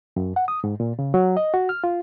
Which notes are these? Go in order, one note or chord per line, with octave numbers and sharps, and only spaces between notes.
F#2
F#5
D#6
G#2
A#2
C#3
F#3
D#5
F#4
F6
F4